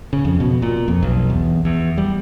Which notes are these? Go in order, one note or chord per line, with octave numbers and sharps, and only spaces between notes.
C#3
F2
B2
A#2
F2
B1
E2
E2
G3